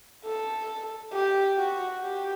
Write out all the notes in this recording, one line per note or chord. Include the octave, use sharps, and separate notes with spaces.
A4
G4
F#4
G4